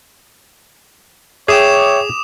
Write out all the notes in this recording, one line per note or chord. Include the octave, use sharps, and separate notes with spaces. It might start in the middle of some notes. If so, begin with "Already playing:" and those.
G#4 C#5 E5 G5 D6 D#6 E7